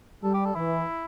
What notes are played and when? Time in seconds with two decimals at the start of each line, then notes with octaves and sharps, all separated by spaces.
0.23 G3 A4
0.34 G4
0.45 A4
0.55 E3 E4